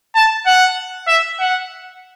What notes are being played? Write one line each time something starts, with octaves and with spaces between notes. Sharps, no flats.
A5
F#5
E5
F#5